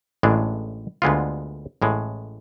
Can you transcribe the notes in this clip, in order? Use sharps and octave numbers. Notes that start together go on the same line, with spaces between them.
A1 A2 G#3 D4
D2 D3 G#3 B3 F4
A1 A2 G#3